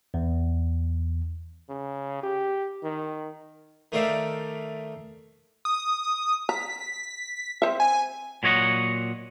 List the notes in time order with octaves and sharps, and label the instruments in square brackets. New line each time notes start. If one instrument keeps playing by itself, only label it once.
[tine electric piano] E2
[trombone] C#3
G4
D#3
[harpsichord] D#3 A3 C5 D5 E5 F5
[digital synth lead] D#6
[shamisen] A#5 [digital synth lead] B6
[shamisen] C4 C5 E5
[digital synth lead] G#5
[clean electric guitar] A#2 F#3 C#5 D#5 F#5